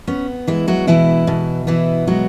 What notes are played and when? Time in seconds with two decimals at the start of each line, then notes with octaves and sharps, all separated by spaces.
0.07 B3 C#4
0.47 E3 G#3 E4
0.68 F#3 F#4
0.87 B2 E3 E4
1.27 B2
1.67 E3 B3 E4
2.07 F#3 G#3 F#4